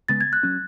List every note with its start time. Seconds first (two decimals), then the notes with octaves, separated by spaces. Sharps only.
0.08 C#3 G#3 B3 A6
0.21 G#6
0.33 F#6
0.43 F#3 C#4